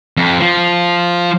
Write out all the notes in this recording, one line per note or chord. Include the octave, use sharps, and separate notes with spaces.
F2
F3